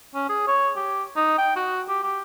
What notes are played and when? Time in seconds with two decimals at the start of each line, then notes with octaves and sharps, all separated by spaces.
0.14 C#4
0.29 G#4
0.47 C#5
0.76 G4
1.16 D#4
1.38 G5
1.56 F#4
1.89 G4
2.03 G4